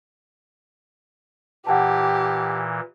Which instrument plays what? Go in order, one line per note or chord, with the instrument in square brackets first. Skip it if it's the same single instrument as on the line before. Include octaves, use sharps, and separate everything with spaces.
[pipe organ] A#2 E3 [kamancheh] G4 [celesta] F#5 G5 A5